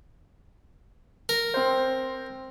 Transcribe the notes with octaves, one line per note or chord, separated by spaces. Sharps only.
A#4
C4 C5